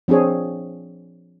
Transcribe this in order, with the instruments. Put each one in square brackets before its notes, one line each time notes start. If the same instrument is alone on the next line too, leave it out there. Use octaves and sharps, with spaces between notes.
[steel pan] F3 C4 D4 G#4 C#5